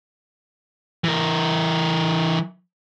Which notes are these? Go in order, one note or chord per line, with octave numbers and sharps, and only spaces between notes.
E3 A#4